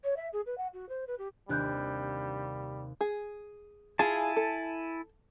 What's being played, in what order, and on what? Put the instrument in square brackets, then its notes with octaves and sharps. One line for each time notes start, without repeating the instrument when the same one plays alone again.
[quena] C#5
E5
G#4
B4
F#5
F#4
C5
B4
G4
[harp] D#2 C3 [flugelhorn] G3 [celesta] D4 F#6 G6
[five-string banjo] G#4
[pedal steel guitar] E4 G#5 A5 [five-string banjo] F4 G#4
[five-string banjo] A4